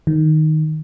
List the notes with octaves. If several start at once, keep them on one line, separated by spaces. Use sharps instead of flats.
D#3